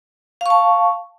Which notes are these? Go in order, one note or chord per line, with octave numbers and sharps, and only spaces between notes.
F5 A5 C#6